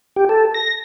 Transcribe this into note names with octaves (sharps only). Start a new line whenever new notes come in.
G4
A4
A#6